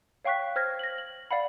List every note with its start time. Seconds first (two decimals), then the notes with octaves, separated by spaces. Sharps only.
0.24 C#5 F5 G5 C#6 F#6 B6
0.56 C5 F6 G#6 A#6
0.79 A#6 F#7
0.98 F#7
1.31 D5 F5 F#5 B5